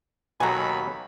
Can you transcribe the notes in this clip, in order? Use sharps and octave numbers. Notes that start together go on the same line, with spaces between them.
D#2 B2 F#3 A4 G#5 A#5 B5